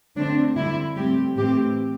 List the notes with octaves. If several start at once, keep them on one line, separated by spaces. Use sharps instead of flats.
D3 A3 C4 D4
D3 G3 C4 E4
A2 G3 C4 G4
A2 E3 C4 G4